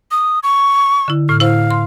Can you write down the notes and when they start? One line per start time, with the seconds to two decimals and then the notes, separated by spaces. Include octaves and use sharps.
0.11 D#6
0.43 C#6
1.08 D3 E4
1.29 A2 F6
1.40 E4 C5 F5
1.71 C6